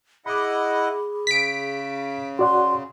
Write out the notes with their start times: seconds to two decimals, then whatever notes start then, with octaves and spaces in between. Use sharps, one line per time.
0.26 E4 G#4 D#5 F#5 B5 D6
1.27 C#3 B6 D7
2.39 F#4 D5 F#5 C6